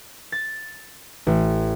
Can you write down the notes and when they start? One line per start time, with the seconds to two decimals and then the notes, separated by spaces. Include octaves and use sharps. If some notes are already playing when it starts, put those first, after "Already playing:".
0.32 A6
1.27 A1